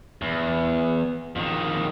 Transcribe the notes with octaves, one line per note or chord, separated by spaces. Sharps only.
E2
F2 D#3